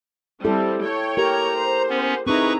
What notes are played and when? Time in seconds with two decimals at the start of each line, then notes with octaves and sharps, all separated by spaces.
0.44 G3 C4 E4 A4
0.85 C#5 G5
1.17 G4 A#4 A#5
1.57 C5
1.89 B3 C#4
2.27 C4 D#4 E4 G#4 B4 A#5 C#6